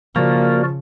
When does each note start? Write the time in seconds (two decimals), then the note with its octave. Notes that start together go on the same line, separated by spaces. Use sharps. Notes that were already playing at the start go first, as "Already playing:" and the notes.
0.16 C#3 F3 A#3 F#4 A#4 D5